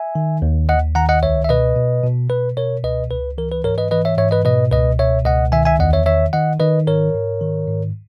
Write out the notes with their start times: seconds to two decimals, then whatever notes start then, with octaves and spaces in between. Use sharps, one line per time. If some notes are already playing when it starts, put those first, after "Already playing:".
Already playing: E5 G#5
0.15 D#3
0.42 D#2
0.69 D#2 D#5 F#5
0.95 D#3 F#5 A#5
1.09 D#5 F#5
1.23 C#2 C#5 E5
1.45 E5
1.49 B2 B4 D#5
1.76 B2
2.04 B2
2.30 B2 B4
2.57 B2 A#4 C#5
2.84 C#2 B4 D#5
3.10 C#2 B4
3.38 E3 A#4
3.51 B4
3.64 G#2 A#4 C#5
3.78 B4 D#5
3.91 E3 B4 D#5
4.05 C#5 E5
4.18 G#2 C#5 E5
4.31 B4 D#5
4.45 B2 B4 D#5
4.71 C#2 B4 D#5
4.99 B2 C#5 E5
5.25 C#2 D#5 F#5
5.52 D#3 E5 G#5
5.65 E5 G#5
5.79 E2 D#5 F#5
5.93 C#5 E5
6.06 D#3 C#5 E5
6.33 D#3 D#5 F#5
6.60 D#3 B4 D#5
6.87 G#2 A#4 C#5
7.14 G#2
7.41 D#3
7.68 G#2